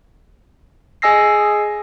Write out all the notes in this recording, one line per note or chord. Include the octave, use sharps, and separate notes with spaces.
G#4 D#5 G#5 E6 A#6 C7